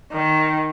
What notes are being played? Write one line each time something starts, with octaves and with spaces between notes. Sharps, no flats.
D#3